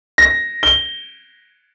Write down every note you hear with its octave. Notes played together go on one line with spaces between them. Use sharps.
A#6
G7